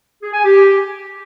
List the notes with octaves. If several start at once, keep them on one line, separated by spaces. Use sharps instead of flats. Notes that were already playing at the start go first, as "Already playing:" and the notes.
G#4
G#5
G4